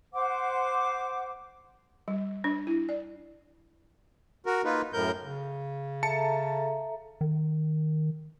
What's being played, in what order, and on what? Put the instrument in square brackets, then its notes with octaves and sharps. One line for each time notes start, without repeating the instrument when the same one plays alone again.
[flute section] C5 F#5 D6
[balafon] G3
D4
E4
D5
[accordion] F#4 A#4
A#3 D#4 F4 B4
F#2 A2 A#4 G6
[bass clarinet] C#3
[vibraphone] A4 E5 A#5 [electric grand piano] A5 C#7
[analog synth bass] D#3